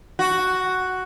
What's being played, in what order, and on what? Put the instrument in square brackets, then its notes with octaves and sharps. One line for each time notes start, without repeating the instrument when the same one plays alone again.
[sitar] F#4